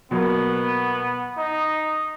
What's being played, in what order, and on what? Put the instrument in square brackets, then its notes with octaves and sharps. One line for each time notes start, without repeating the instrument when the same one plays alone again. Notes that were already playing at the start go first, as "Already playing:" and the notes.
[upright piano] B2 F#3 A#3 [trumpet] B3
[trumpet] D#4